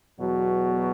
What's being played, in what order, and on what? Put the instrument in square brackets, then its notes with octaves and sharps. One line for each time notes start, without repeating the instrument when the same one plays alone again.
[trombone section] E2 B2 F#3